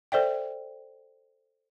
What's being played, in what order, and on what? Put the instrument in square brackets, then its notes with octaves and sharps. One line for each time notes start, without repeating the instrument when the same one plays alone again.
[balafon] A4 C5 D5 E5 G5